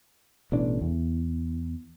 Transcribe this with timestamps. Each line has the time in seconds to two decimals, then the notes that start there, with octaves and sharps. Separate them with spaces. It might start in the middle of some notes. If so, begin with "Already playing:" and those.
0.52 A1 B2 E3 D4
0.81 E2